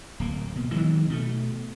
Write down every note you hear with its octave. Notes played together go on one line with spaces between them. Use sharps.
D1 A#3
B2
D#3 E3 F#3 G#3
B2 A3